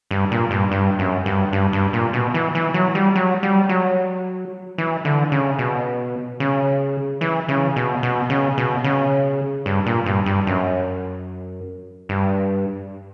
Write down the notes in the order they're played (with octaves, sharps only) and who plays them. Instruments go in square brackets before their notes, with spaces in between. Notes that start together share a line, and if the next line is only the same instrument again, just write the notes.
[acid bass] G2
A#2
G2
G2
F#2
G2
G2
G2
A#2
B2
E3
E3
F#3
G3
F#3
G3
F#3
E3
D3
C#3
B2
C#3
E3
C#3
B2
B2
C#3
B2
C#3
G2
A#2
G2
G2
F#2
G2